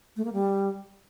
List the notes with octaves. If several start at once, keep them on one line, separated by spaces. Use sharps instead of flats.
A3
A#3
G3